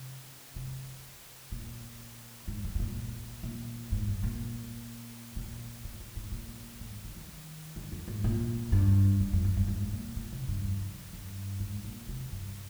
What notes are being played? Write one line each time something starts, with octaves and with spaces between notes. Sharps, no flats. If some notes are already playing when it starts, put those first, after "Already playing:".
Already playing: C3
C3
A#2
G#2
G#2
G#2
A#2
A#2
G#2
G2
A#2
A#2
A#2
A#2
G#2
A#2
G#2
D3
D#3
D3
F2
G#2
A#2
G2
G2
F2
G2
G2
G#2
A#2
A#2
C3
G2
F2
G2
G#2
A#2
C3
G2